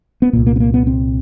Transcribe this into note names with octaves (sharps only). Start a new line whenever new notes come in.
B3
C2 A#2 A#3
A#3
B3
A#3
B3
C4